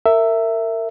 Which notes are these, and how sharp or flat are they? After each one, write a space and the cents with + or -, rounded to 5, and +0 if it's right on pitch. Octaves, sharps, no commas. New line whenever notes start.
A#4 -30 E5 +5